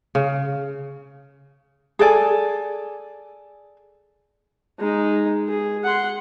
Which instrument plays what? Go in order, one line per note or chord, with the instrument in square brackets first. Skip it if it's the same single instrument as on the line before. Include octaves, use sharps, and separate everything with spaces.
[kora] C#3
[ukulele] G#4 A4 D5 G#5
[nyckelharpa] G#3 D#4
G#4
F#5 C6